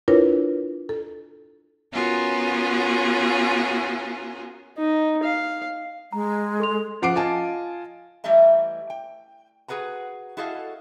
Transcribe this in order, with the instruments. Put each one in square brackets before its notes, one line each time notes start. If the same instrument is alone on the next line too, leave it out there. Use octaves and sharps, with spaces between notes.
[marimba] D4 E4 F4 A#4 B4 C#5
A4
[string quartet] B3 C#4 F4 F#4 G#4 A#4
[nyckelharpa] D#4
F5
[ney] G#3 [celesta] A#5
[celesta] A4 C6 F7
[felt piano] C#3 F3 F#5 D6 C7 D7
F4 D#5 G#5 A5
[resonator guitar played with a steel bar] E3 G3 A3 D#5 E5 A#5
G5
F#4 G#4 B4 F#5 A#5
E4 F#4 G#4 A4 D#5 F5